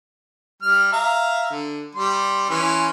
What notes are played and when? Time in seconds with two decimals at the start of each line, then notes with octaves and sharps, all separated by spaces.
0.62 G3 F6
0.93 E5 F5 A#5
1.51 D3
1.95 G3 C6
2.50 E3 C#4 C6